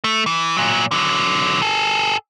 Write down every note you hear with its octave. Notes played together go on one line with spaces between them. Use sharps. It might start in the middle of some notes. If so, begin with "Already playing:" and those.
A3
E3
A#2 F#3
D3 F#3
G#4 A4